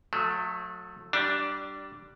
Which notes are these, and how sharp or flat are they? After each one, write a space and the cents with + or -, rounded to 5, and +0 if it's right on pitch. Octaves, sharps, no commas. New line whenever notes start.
F#3 -35 A3 +0
G3 -20 D4 +0